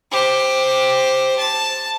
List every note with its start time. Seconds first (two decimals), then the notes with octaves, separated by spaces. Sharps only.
0.11 G4 C5
1.38 A5